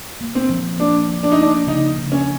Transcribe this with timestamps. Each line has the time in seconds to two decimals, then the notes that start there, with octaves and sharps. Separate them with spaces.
0.21 A#3
0.35 C4
0.50 F3
0.79 A#3 D4
1.09 F3
1.23 D4
1.32 D#4
1.39 A#3 D4
1.67 C#3 D#4
1.97 C#3
2.12 C#4